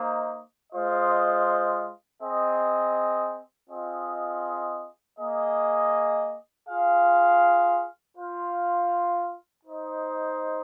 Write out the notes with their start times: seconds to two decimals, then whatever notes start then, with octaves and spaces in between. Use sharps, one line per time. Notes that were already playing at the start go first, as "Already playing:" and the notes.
Already playing: A#3 D#4 C5 D#5
0.73 G#3 F4 C5 D#5
2.22 C4 G#4 D#5
3.69 C4 F4 G#4 D#5
5.19 A#3 G#4 D#5
6.68 F4 G#4 F5
8.16 F4 C5 F5
9.64 D#4 C5 D#5